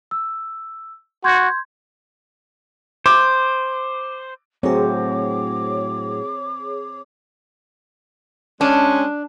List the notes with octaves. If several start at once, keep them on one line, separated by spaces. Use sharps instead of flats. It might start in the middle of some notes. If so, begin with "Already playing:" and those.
E6
F#4 C6 G6 G#6
C5 D6
A2 F#3 C4 F#4 G#4 C#5 D6
G#3 C#4 D4